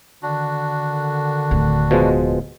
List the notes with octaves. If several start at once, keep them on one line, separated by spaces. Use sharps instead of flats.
D3 D#3 D4 F#4
D1 D2
B2 F3 G#3